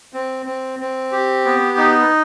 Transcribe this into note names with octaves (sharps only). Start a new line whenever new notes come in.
C4
C4
C4
G4
B3
D#4